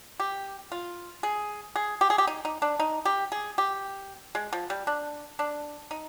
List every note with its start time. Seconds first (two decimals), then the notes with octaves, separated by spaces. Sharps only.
0.20 G4
0.72 F4
1.23 G#4
1.76 G#4
2.01 G4
2.10 G#4
2.18 G4
2.27 D#4
2.45 D#4
2.62 D4
2.80 D#4
3.05 G4
3.32 G#4
3.58 G4
4.35 G#3
4.53 F3
4.70 G3
4.87 D4
5.39 D4
5.91 D#4